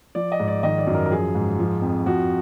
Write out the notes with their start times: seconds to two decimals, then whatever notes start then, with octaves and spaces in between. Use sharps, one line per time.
0.15 F3 D5
0.32 D#5
0.40 G#2
0.48 D5
0.63 D#3 D#5
0.78 D5
0.87 F#2
0.94 A#4
1.06 A#4
1.10 F3 G#4
1.35 G#2
1.59 F3
1.82 F2
2.06 F3 F#4